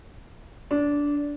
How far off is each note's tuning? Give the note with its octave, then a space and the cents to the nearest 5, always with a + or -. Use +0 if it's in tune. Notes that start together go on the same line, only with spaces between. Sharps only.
D4 -15